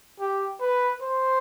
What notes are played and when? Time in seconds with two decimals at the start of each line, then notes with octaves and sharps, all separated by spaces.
0.20 G4
0.61 B4
1.02 C5